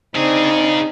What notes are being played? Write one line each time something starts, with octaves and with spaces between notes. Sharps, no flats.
C#3 C4 D4 D#4 G#4